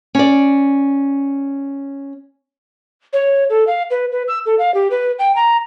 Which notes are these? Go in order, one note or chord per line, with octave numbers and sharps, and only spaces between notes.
C#4 D5
C#5
A4
F5
B4
B4
E6
A4
F5
G4
B4
G5
A#5